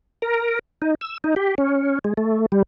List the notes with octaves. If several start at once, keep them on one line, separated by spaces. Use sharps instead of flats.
A#4
D#4
E6
D#4
G4
C#4
G#3
A3
G3